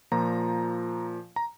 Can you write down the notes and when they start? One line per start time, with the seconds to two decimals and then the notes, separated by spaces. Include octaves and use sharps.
0.12 A#2 F3 A#5
1.36 A#5